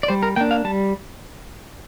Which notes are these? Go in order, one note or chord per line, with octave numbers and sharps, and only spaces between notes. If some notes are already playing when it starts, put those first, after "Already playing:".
D5
G3 C5
A#4
A#3 D4 G5
F5
G3 A5